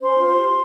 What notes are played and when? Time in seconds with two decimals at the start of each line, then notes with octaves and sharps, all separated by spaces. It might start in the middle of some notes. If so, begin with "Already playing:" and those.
0.01 C#4 C5 C6
0.19 F4 C5
0.37 G4